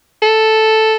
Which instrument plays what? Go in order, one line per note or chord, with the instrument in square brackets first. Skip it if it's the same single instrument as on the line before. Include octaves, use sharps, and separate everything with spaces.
[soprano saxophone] A4